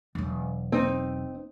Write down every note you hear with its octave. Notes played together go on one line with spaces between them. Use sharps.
E1 F#3
C4 D#4